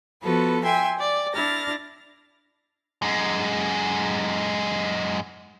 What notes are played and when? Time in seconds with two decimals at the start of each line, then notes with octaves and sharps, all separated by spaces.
0.22 F3 B3 F#4 A4 B4
0.63 E5 G5 G#5 C6
0.99 D5
1.32 D4 E4 F6 A6 A#6
3.02 F#2 G#3